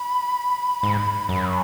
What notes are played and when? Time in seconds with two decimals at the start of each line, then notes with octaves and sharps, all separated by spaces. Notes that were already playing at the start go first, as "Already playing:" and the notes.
Already playing: B5
0.83 G#2
1.29 F#2